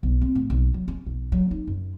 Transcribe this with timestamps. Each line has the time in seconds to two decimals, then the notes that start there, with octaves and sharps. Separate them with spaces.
0.03 B1
0.21 C4
0.35 A2
0.50 B1
0.74 F#3
0.88 C#4
1.06 B1
1.32 F#3
1.51 D#4
1.67 F#2